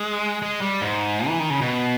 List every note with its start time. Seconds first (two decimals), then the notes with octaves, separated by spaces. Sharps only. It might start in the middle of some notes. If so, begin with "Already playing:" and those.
Already playing: G#3
0.42 G#3
0.62 G3
0.81 G#2
1.28 E3
1.39 D#3
1.50 C#3
1.61 B2